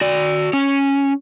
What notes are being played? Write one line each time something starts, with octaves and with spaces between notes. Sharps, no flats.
F#4 D5
C#4